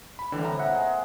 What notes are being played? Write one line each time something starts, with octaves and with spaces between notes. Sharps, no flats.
B5
A2 D3 E3 G3
A2 C3 A#5
A#2 E5 F#5
G#3 G#4